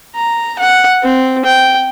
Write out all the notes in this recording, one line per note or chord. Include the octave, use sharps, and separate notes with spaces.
A#5
F#5
C4
G5